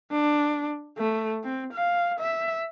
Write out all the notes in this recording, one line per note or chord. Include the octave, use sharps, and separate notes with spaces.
D4
A3
C4
F5
E5